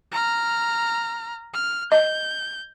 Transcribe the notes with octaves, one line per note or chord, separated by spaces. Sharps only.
A#5 F6
F6
D#5 G6